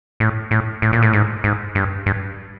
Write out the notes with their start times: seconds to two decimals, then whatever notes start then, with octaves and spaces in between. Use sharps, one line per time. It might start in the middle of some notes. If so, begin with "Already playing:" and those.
0.20 A2
0.51 A2
0.82 A2
0.93 A#2
1.03 A2
1.13 G#2
1.44 G#2
1.75 G2
2.06 G2